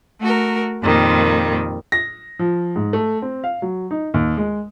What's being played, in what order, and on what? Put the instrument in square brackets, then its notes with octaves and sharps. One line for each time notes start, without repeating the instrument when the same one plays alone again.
[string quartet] A3 F#4 A#4
F2 A#2 D#3 G3
[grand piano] A#6
F3
G#2
A3
C4
F5
F#3
D#4
D#2
G#3